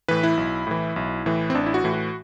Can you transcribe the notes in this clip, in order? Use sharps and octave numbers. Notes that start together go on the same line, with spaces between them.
A2 E3 B4
E4
B1
A2 E3
B1
A2 E3
C4
A1 D4
E4
F#4
A2 E3
F#4